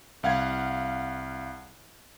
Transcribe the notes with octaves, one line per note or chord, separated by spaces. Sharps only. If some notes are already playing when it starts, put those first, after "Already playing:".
C2 F5 F#5 G#6